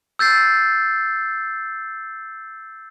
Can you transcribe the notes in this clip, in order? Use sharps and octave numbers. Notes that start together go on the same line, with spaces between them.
E6 G6 A6 C7